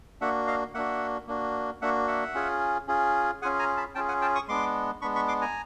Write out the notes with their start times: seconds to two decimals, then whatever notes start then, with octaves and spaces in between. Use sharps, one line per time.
0.21 A#3 D4 F#4 E5 F#5
0.47 D#5 F5
0.74 A#3 D4 F#4 E5 F#5
1.28 A#3 D4 F#4
1.81 A#3 D4 F#4 E5 F#5
2.08 E5 F#5
2.35 C#4 F4 G#4
2.88 C#4 F4 G#4
3.42 C#4 F4 G#4 F#5 G#5
3.59 G#5 A#5
3.77 A5 B5
3.95 C#4 F4 G#4 G5 A5
4.08 F#5 G#5
4.21 G5 A5
4.35 C#6 D#6
4.48 G#3 B3 D4 C6 D6
5.01 G#3 B3 D4 B5 C#6
5.15 B5 C#6
5.28 C6 D6
5.41 G#5 A#5